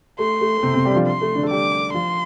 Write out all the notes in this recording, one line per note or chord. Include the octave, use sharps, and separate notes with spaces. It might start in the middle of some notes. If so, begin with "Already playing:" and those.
A3 C6
A3
A3
C3 C4
C3 C4
G3 G4
D4
F3 F4
C6
A3
D3 D4
A4
G3 G4 D6
F3 F4 C6